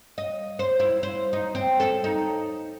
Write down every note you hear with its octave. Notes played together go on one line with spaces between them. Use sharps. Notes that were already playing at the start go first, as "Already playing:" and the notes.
D#5
C5
E4
C5
D#4
C4
A4
D#4